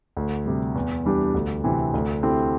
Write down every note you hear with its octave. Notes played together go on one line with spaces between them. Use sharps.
D2
C3 G3
E2
E3 G3 D4 G4
D2
C3 E3 C4
D2
D3 C4 E4 G4